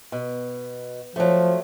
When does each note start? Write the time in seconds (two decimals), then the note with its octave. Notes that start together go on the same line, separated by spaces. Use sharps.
0.12 B2
1.16 F3 F#3 A3